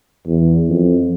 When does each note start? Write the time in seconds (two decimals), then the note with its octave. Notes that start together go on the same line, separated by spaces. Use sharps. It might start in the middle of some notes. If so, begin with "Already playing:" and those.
0.27 E2
0.69 F2